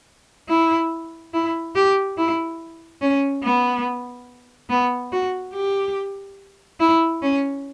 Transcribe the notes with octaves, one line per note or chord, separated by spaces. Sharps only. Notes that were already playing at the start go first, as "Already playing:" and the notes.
E4
E4
G4
E4
C#4
B3
B3
F#4
G4
E4
C#4